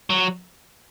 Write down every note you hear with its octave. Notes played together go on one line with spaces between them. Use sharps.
F#3